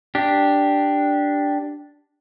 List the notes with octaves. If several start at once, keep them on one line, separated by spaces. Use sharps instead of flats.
D4 G4